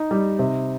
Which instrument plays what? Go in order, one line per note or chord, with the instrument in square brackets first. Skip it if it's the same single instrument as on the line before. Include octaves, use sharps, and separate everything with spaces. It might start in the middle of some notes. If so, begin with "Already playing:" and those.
Already playing: [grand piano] D#4
G3
C3